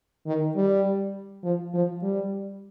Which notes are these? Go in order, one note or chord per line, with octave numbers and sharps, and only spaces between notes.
D#3
G3
F3
F3
G3